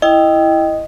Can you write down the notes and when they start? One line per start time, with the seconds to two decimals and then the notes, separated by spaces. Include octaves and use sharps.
0.02 E4 D#5 G5